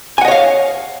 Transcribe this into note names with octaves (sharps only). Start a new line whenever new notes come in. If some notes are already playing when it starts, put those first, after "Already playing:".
C#5 D#5 F5 F#5 G#5